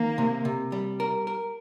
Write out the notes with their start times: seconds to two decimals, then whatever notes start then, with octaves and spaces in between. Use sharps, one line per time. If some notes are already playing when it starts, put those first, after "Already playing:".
Already playing: D#3 A#3
0.18 C3
0.45 C3
0.72 G3
1.00 A#4
1.27 A#4